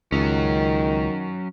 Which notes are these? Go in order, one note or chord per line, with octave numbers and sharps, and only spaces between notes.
C#2 D#3 F#3 C#4